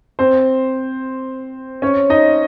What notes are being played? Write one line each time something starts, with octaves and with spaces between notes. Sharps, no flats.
C4 C5
C#4 C#5
D#4 D#5